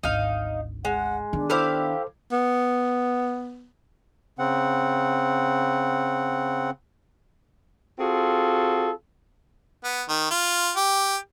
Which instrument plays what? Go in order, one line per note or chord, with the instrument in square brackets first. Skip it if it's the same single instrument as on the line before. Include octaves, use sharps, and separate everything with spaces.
[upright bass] G#1 D2 [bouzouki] D#4 F5
[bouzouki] G#3 [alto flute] F#5
[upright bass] D#3 B3 [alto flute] D4
[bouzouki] E4 G4 F5 [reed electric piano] A4 C5 D6
[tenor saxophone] B3
[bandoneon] C#3 C4 F#5
[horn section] C4 F4 F#4 G#4 A4
[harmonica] B3
D#3
F4
G4